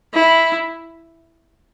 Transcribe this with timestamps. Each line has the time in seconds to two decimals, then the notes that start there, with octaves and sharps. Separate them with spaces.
0.14 E4